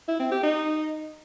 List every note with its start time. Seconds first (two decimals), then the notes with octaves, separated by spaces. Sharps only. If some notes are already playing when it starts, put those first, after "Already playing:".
0.08 E4
0.20 C4
0.31 G4
0.43 D#4